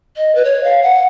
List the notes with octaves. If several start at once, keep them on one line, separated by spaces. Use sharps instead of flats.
D#5
B4
C#5
F5
F#5